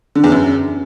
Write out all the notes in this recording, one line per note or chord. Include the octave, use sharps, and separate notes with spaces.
D3
E2
F#2